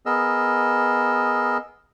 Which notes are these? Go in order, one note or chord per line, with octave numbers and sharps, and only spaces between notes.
B3 G#4 A#4 D#5 E6